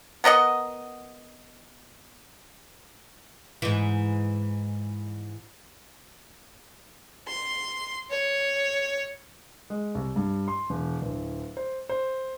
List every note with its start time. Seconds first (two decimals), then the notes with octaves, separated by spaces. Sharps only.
0.24 B3 A#4 D#5 F#5
3.62 G#2 E3
7.28 C6
8.10 C#5
9.70 G#3
9.95 C2
10.16 G2
10.48 C6
10.70 E1
11.02 D1
11.57 C5
11.89 C5